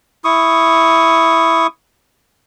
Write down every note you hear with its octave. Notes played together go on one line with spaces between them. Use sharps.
E4 C#6 D#6